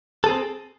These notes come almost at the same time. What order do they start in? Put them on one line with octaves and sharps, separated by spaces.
A4 G#4 C4